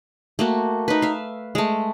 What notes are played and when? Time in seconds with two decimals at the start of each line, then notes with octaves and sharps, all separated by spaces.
0.39 A3 A#3 F#4
0.88 D#4 B4
1.02 E5 F5
1.55 G#3 A3